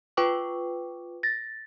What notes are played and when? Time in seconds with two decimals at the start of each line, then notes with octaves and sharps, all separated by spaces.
0.17 F4 B4 G5 C#6 D6
1.23 A6 A#6